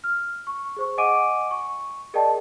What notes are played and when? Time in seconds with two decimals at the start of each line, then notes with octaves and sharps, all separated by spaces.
0.04 F6
0.47 C#6
0.77 G#4 C5 C#6
0.98 D#5 F#5 G#5 D6 D7 D#7
1.51 C#6
2.14 G#4 A#4 D5 D#5 G5 A5